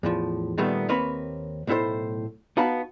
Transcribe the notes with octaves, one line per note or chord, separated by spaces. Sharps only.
E2 A2 F3
A#2 D#3 G3 A3 B3
D#2 A#3 C4 B4 C#5 B5
B1 A2 E4 A4 C5
B3 D#4 F#4 F5 A5 B5